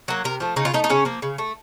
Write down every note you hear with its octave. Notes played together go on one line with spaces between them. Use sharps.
F#3 A#3
C3 A#4
F3 A3
C#3 D#4
F4
A3 D#4
D#4
C#3 C#4
F3 A#3
C#3
A3